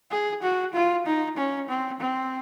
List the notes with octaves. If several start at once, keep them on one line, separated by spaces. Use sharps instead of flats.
G#4
F#4
F4
D#4
C#4
C4
C4